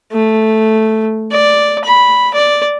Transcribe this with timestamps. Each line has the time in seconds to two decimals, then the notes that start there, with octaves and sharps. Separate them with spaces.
0.12 A3
1.31 D5
1.85 B5
2.34 D5